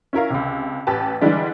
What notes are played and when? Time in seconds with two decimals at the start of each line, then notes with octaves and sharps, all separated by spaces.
0.13 C#4 E4 A#4 F5
0.30 C#2 C3
0.87 A1 G4 B4 A5
1.21 D3 E3 G3 G#3 D4